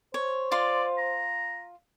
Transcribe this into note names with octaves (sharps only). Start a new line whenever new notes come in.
C5 C#5
F4 D5 F5 C6
A#5